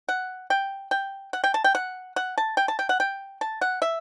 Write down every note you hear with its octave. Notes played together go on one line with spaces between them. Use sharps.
F#5
G5
G5
F#5
G5
A5
G5
F#5
F#5
A5
G5
A5
G5
F#5
G5
A5
F#5
E5